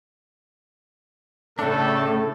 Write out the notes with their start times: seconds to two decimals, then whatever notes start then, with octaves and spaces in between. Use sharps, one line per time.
1.59 A2 C#3 A3 D4 A4